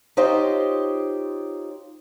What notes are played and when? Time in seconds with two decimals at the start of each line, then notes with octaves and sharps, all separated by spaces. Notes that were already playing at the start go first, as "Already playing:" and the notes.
0.17 D#4 F4 G4 C5 C#5 D#5